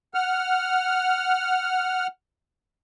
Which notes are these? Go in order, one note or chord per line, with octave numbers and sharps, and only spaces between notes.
F#5 F6